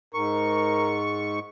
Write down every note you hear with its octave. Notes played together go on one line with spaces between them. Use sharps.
G#2 A#4 C#6